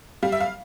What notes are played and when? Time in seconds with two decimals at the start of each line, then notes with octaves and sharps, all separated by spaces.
0.23 G3 F5
0.32 E5
0.40 F5